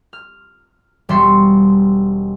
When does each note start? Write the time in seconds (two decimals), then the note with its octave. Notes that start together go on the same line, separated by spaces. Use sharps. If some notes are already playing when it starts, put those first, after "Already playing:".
0.13 F6
1.09 E1 G3 C#5 E5 C6